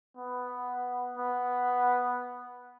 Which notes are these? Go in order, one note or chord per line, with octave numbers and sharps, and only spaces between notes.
B3
B3